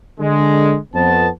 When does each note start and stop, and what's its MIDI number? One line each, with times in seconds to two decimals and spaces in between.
0.19 0.77 50
0.19 0.77 56
0.94 1.28 41
0.94 1.28 59
0.94 1.28 72
0.94 1.28 81